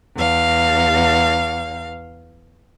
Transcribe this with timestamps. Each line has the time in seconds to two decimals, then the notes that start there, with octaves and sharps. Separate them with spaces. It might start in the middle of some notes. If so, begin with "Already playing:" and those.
0.16 E2 F5